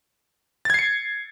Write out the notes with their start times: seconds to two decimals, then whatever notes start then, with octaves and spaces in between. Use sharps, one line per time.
0.65 A6
0.70 G#6
0.74 C7
0.79 C#7